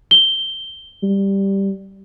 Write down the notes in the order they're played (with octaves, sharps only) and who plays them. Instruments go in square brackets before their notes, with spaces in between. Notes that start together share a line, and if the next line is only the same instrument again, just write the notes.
[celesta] G7
[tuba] G3